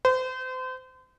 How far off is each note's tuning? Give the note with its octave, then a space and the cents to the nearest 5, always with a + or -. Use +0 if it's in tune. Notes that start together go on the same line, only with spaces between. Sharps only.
C5 -35